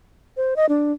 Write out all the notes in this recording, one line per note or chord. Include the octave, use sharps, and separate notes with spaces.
C5
D#5
D4